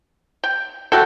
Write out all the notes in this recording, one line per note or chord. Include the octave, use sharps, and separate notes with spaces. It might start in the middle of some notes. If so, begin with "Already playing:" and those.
G5
A3 F#4 A4 G5